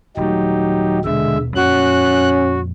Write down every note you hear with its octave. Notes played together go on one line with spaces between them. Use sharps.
D#1 F#3 A3 D#4 G4
D#1 B2 D3 G#3 E5
F2 A#2 C#4 F#4 F#6